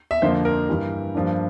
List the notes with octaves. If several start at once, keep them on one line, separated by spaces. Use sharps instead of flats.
E5
F2 D3 F3 A#3 C5
A#4
G2 E3 G3
G2 F3 A#3 D4